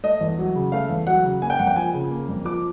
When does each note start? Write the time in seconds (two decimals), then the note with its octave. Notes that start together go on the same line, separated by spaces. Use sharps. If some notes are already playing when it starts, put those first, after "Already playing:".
0.04 A3 D#5
0.21 E2
0.39 F#3
0.55 C#3
0.72 A3 F5
0.89 E2
1.07 F#3 F#5
1.24 C#3
1.42 A#3 G#5
1.50 G5
1.59 F2 F#5
1.67 G5
1.76 F3 G#5
1.94 C#3
2.11 A#3
2.29 F2
2.45 F3 D6